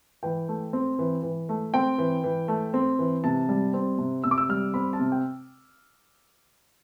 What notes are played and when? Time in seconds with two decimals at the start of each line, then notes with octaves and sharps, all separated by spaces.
0.23 E3 G5
0.48 A3
0.73 C4
0.99 E3
1.23 E3
1.49 A3
1.74 C4 G5
1.98 E3
2.24 E3
2.48 A3
2.74 C4
2.99 E3
3.24 C3 A5
3.49 G3
3.74 C4
3.98 C3
4.24 C3 E6
4.31 D6
4.38 E6
4.49 G3 F6
4.74 C4 B5
4.93 A5
4.99 C3
5.12 G5